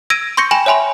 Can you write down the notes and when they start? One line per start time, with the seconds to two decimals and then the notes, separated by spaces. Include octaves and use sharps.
0.10 E6 G#6 A#6 D7 D#7
0.37 C6 C#6 G6 A#6 C#7
0.51 G5 G#5 B5 E7 F#7
0.66 C#5 E5 G#5 B5 C6